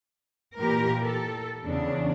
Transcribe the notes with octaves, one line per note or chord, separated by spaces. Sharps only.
A#2 E3 G4 A#4
A4
E2 C#3 D4